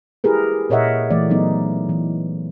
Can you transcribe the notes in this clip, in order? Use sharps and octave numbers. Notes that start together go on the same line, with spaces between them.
E4 G4 G#4 A#4 B4
A#2 A#4 C#5 D#5 E5 F#5
E3 A3 D5
F#3 B3 D#4
E3